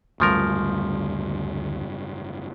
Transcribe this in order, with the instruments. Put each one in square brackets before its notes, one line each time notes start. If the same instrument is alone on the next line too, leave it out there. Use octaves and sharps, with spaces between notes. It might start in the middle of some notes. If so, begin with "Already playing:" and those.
[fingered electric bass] F#1 G#2 G3 [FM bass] D2 [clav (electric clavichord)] C#3 F3 A#4